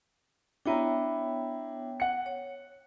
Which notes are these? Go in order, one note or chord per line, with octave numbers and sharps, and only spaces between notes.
B3 D4 E4 C#5 G5 A#5
F#5 C#7
C#5